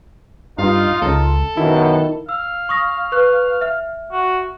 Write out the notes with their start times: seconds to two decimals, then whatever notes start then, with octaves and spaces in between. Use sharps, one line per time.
0.58 G2 D#4 F4 F5
1.02 C#2 A4
1.57 F#2 B2 D#3 E4
2.29 F5 E6
2.69 C#6 D#6 A#6
3.12 B4 C#6 F#6
3.61 E5 F6
4.12 F#4